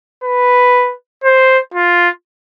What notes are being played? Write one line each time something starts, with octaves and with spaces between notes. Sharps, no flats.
B4
C5
F4